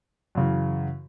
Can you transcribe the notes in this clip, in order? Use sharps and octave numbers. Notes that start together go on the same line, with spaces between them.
F#2 C#3 E3